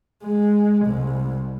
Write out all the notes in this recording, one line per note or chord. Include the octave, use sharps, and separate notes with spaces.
G#3
C2